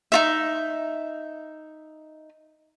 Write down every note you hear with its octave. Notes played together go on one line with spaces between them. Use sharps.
D#4 F4 E5